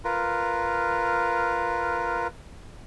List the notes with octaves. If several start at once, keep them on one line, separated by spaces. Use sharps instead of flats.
F4 A#4 B4